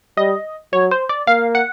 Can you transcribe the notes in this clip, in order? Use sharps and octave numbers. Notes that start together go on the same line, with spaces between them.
G3 D#5
F#3 C#5
C5
D5
A#3 F5
F#5